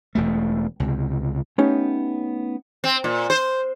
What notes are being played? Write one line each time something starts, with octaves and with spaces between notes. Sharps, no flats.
E1 E2 A3
C#2 C3
A3 B3 C#4 D#4 G4
C4
A#2
C5